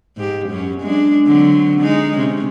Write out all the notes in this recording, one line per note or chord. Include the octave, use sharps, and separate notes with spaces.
G#2 G4
F#2 C#4
G#3 D4
D3 F#3 C4
G#3 D#4
C3 C#4